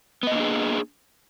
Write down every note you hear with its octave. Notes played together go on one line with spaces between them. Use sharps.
A#3 B3 D4 G#4 D#5